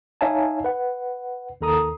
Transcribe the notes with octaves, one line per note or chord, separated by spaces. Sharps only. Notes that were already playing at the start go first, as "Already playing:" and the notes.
D#4 C#5 E5 F5 G#5 A5
B4 F#5
D#2 D#3 A4 A#5 D#6